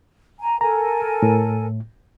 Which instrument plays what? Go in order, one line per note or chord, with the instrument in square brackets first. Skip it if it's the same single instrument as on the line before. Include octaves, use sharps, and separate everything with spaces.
[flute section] G#5 A#5
[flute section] A4 A#4 G#5 [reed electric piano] A#5
[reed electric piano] A2